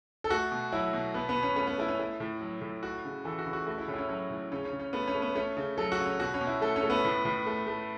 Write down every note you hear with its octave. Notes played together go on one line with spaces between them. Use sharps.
A4
A3 F#4
B2
F#3 E4
B2
B2 B3
B3
B2
C#4
A3 C#4
B3
A3 E4
C#4
A3 E4
A2
F#3
A2
A3 F#4
C#3
E3 A4
F#4
C#3
F#4
A3 F#4
E4
A2 C#4
E4
C#4
F#3 C#4
A2
C#3 C#4
C#4
C#3
C#4
A3 B3
C#4
A3
B3
A3 C#4
C#3
F#3 A4
F#4
C#3
C#4
B2 F#4
C#4
B2
E4
A3 A4
C#4
A3
B3
A2
A2
A3
A3